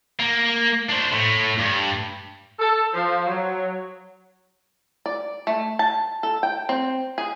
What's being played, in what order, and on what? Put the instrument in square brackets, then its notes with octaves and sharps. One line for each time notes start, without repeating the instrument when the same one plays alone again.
[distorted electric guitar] A#3
D4 C5
A2
G2
[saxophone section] A4
F3
F#3
[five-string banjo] D5
A3
A5
A4
G5
C4
G#4